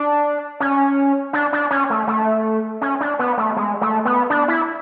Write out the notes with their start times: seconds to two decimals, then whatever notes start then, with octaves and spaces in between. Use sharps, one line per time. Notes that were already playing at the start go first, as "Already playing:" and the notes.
Already playing: D4
0.60 C#4
1.33 D4
1.53 D4
1.71 C#4
1.90 A3
2.07 A3
2.81 C#4
3.01 D4
3.19 B3
3.37 A3
3.56 G#3
3.81 A3
4.05 B3
4.30 D4
4.48 E4